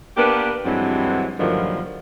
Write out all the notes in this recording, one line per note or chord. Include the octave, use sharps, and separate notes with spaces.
A#3 B3 D4 G4 A#4 B4
G2 E3 F#3 G#3 C4
G2 A#2 D3 D#3 F3 F#3